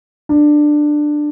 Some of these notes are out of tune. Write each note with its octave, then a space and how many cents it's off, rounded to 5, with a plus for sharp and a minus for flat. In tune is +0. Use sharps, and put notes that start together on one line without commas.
D4 +15